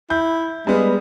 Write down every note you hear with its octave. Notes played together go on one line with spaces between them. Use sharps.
E4 G6
G3 G#3 B3